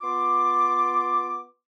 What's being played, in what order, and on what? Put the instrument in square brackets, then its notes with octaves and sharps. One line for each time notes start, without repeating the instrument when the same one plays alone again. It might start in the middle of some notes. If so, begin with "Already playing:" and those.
[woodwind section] B3 F4 C6 D6